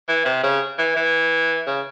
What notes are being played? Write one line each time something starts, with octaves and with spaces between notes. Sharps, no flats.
E3
C3
C#3
E3
E3
C#3